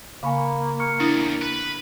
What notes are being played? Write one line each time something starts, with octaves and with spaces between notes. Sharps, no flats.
C#3 A#3 F5 G#5 B5 C#6
C#6 F6 C#7
E2 D4 E4 D#6
B4